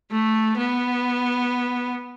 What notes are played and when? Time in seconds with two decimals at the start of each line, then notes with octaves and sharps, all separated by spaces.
0.12 A3
0.58 B3